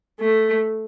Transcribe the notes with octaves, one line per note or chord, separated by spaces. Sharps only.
A3